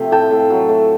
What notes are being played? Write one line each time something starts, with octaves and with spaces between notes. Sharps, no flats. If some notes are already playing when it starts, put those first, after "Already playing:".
Already playing: C3 F3 A3
A2 G5 A5
A2
F#3
A3